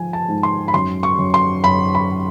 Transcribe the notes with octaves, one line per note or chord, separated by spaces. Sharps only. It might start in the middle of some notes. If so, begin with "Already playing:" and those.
Already playing: G#2 F3 G#5
A5
G#2
C6
B5
F#2 C6
C#6
F#2
C6
F#2 B5
B5